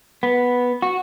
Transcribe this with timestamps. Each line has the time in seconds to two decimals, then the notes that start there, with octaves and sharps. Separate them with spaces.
0.23 B3
0.82 F#4